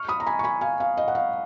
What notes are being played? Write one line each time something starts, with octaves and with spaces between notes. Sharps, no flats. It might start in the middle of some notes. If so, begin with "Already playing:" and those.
Already playing: C#6 F6
B5 D#6
A#5
G#5 B5
C#6
G#5 B5
F5 G#5
F5
D#5
F#5
F5